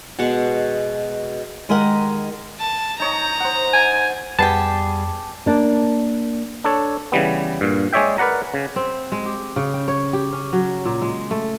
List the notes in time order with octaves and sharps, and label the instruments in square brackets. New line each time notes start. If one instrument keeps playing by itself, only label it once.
[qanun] B2 G#3 F#5 C#6
[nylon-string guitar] D#3 G#3 G4 A#4 D#5 F#5
[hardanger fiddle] A5
[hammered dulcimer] D#4 C#5 D#5 [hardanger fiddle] A#5
[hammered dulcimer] C5 F#5
[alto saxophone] G#5
[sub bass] F2 [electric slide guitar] G3 G#4 [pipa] B3 G4 [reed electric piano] A5
[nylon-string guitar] A#3 D4
[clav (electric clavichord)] D4 A4 C#5
C#3 E3 G3 B3
G2 A#2
G#3 G#4 C#5 D5 E5 G5
A#4 B4 D5 F#5 A#5
C#3
[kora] C4
G#3
G4
C#3
G5
C#5
G4
C#4
F#3
A#2
G#3
A3